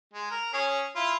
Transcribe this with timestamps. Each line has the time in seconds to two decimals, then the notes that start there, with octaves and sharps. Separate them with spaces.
0.13 G#3
0.31 A#4
0.54 C#4 G#4 C#5
0.96 E4 F4